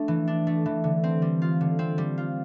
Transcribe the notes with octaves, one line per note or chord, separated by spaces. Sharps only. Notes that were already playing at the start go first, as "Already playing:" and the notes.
Already playing: A3 D4
E3
D4
A3
E3
D3
C4
G3
F4
D3
C4
G3
F4